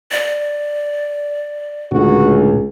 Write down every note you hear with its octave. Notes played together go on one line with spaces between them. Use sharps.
D5
C#2 A2 D3 F#4